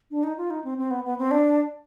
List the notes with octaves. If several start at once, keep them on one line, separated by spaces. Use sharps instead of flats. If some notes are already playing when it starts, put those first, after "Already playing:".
D4
D#4
F4
D#4
C4
C4
B3
B3
C4
D4